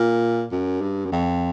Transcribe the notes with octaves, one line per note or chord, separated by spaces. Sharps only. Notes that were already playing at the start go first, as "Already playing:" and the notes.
Already playing: A#2
F#2
G2
F#2
F2